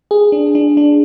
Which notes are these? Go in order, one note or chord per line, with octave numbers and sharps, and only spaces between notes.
G#4
D4
D4
D4